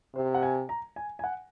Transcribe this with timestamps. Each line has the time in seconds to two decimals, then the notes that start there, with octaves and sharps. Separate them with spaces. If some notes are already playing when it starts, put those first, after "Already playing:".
0.15 C3 C5
0.35 F#5
0.43 G#5
0.69 A#5
0.96 G#5
1.19 G#5
1.24 F#5